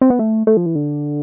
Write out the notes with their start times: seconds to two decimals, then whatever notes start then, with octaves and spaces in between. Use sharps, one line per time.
0.01 C4
0.10 B3
0.19 A3
0.47 A3
0.57 F3
0.66 E3
0.75 D3